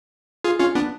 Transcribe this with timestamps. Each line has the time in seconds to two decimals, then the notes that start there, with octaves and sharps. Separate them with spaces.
0.44 F4 G#4
0.60 C#4 F4
0.75 B3 D4